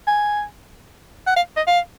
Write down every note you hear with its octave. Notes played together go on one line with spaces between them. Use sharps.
G#5
F#5
F5
D#5
F5